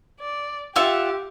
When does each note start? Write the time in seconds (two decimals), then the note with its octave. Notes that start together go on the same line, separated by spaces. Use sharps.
0.20 D5
0.76 F4 G4 E5 F#5